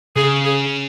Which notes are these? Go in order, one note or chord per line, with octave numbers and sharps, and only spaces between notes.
C#3 G#4
G#4